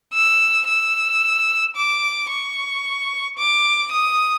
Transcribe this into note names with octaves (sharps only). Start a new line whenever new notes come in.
E6
E6
D6
C#6
D6
D#6